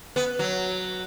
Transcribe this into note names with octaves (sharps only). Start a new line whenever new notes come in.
B3
F#3